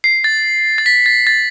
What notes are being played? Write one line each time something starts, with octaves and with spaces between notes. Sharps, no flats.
C7
A6
A6
B6
A6
A6